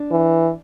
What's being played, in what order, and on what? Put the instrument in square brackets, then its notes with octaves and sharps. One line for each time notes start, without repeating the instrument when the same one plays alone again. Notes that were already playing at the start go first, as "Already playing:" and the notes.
Already playing: [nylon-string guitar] D4
[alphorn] E3